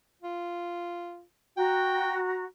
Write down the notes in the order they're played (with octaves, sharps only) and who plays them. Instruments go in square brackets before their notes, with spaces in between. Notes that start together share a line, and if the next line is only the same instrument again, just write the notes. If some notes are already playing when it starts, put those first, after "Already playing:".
[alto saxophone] F4
[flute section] F#4 A#5 [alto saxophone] G5